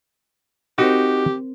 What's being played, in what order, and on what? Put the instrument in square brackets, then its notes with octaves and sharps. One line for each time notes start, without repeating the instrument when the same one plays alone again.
[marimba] C4 A#4 C5 [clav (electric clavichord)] D#4 F#4 [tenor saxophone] G4